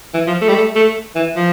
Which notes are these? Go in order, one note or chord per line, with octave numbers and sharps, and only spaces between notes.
E3
F3
A3
G3
A3
A3
E3
F3